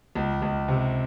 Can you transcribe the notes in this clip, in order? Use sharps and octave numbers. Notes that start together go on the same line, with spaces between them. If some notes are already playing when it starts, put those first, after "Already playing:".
C#2
C#2
C3